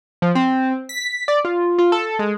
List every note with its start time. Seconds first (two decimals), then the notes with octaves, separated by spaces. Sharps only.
0.22 F3
0.35 C4
0.89 B6
1.28 D5
1.45 F4
1.78 F4
1.92 A4
2.19 G#3